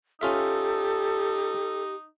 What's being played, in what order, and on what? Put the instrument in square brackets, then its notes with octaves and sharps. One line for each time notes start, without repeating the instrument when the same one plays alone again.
[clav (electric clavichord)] C#4 F4 E5 [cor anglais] D#4 [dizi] G4 [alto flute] A4